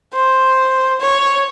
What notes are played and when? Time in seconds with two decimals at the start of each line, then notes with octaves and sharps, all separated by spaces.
0.14 C5
1.01 C#5